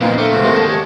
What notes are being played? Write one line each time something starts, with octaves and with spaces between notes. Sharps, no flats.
F2 A#2 B3 D4 F5 G5
A3 A4 D6
C#2 A3 F#4 C5
D#2 C3 G#3 A#3
A5
G4 C#5